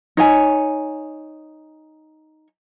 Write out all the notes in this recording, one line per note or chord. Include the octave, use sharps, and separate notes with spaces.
D#4 C#5 G#5